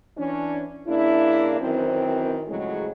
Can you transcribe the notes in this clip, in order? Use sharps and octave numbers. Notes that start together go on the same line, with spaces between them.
E3 C#4 D4
C#3 A#3 D4 E4
F#2 D#3 E3 C4
A2 C#3 F3 F#3 G#3